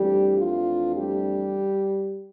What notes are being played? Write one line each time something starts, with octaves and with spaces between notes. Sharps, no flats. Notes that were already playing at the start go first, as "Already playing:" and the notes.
Already playing: F2 E3 G3 A3 D4 G4
F4
G3 G4